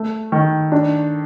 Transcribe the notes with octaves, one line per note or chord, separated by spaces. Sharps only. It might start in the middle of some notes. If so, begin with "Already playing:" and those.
Already playing: A3
D#3
D4